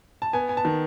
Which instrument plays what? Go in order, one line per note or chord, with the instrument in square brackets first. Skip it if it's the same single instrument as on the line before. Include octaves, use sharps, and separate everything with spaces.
[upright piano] A5
[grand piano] B3 [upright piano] G#5
[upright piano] G#5
A5
[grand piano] D#3